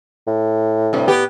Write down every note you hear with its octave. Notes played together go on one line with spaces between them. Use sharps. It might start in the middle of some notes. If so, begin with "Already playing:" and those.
A2
G2 C3
B3 G4